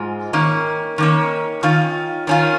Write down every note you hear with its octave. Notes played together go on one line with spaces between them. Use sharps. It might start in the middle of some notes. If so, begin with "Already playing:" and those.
Already playing: G#2 G#3 F4
D#3 A#3 C#4
D#3 A#3 C#4
D#3 C#4 F4
D#3 C#4 F4